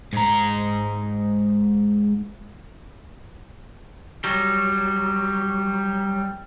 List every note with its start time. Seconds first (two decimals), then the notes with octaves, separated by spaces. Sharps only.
0.13 G#2 A#5
4.24 F#3 G3